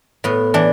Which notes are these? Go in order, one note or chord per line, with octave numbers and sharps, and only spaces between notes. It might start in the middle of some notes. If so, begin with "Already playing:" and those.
A2 B3
E3 D4